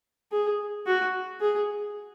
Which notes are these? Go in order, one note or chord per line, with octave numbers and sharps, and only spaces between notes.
G#4
F#4
G#4